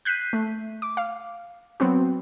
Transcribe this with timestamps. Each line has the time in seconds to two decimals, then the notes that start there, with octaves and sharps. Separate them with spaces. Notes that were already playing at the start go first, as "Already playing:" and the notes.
0.05 F#6 G6 B6 C7 D#7
0.33 A3
0.82 D6
0.97 F5
1.80 F#3 B3 C4 F#4